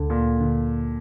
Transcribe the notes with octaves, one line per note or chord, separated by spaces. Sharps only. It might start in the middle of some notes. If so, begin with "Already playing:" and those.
Already playing: D2 D3
A#2
D3